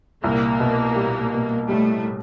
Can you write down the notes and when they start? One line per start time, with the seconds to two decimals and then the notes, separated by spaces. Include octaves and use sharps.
0.24 C2 A#2 A#3
0.60 B2
0.96 G3
1.32 B2
1.68 A2 G3 A3